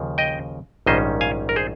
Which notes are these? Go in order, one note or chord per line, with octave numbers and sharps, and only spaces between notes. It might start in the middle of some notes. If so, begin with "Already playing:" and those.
Already playing: D#2 C#3 F3
D#5 G5
A#1 G#2 D#3 G3 C#4 C5 D#5
F5 G#5
A#4
G#4 C5